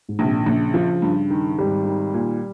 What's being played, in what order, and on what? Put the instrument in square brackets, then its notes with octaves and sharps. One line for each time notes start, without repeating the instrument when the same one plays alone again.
[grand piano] G#2
[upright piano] A#1 [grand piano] C3
[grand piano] A#2
D#3
[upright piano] A#1 [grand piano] C#3
[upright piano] F3
G2
D#3
[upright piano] G#1 [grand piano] G3
[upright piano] D#3
A#2